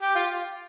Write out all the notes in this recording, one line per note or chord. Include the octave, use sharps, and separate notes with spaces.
G4
F4